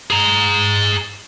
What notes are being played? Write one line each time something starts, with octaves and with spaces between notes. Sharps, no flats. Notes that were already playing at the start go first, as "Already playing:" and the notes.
G#4 A#5